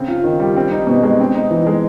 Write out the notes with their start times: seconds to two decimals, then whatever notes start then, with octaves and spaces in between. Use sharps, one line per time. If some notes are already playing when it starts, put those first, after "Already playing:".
Already playing: C#3 C4
0.08 F4
0.24 D#3
0.40 G3
0.56 C4
0.71 D#4
0.87 B2
1.03 G#3
1.20 C4
1.35 D#4
1.51 E3
1.67 G#3